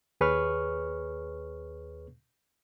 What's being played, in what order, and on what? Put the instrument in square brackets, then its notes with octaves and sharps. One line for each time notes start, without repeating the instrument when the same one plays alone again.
[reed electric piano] D#2 G#4 B4 C#5 C#6 F6